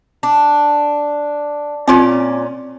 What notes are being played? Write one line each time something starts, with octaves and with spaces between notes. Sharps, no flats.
D4
A#2 C4 C#4 F4 D5